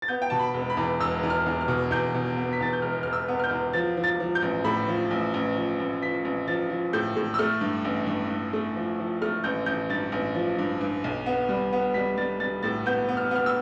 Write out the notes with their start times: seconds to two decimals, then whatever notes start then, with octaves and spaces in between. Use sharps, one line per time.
0.02 A6
0.08 B3 G6
0.22 G5
0.30 B2 A5
0.39 B5
0.54 E1
0.70 B5
0.77 E2
1.00 E1 E6
1.23 E2
1.30 F6
1.46 E2
1.61 F6
1.68 B2
1.91 E2 G6
2.14 B2
2.36 B3
2.53 B6
2.60 E2 A6
2.73 G6
2.82 E1 F6
3.03 E1 F6
3.13 E6
3.28 B3
3.40 F6
3.44 G6
3.51 E2
3.73 F3 A6
3.97 F3
4.04 A6
4.20 F3
4.35 G6
4.42 A1
4.64 A2 B5
4.88 F3
5.11 A1
5.34 A1
5.56 F3
5.80 A1
6.02 F3 B6
6.25 A1
6.48 F3 A6
6.70 F3
6.93 A2 G6
7.16 A2
7.34 E6
7.39 A3 F6
7.61 G2
7.84 A1
8.07 G2
8.29 G2
8.53 A3
8.76 F3
8.99 F3
9.22 A3 F6
9.44 A1 G6
9.66 A1 G6
9.90 G2 A6
10.12 A1
10.35 F3
10.58 G2
10.81 G2
11.04 B1
11.26 B3
11.49 G3
11.73 B3
11.94 G3 B6
12.18 G3 A6
12.40 G3 A6
12.63 A2 A6
12.86 B3 G6
13.09 B3
13.17 F6
13.31 B3 F6
13.46 E6